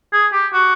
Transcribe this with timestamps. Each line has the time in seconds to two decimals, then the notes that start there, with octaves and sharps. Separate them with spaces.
0.13 G#4
0.33 G4
0.53 F#4